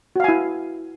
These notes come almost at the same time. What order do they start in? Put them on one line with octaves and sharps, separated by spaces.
F#4 F5 G#5 E4